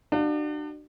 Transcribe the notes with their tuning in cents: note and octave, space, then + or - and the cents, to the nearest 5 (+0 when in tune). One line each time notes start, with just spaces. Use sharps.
D4 +35 F#4 +35 F5 +20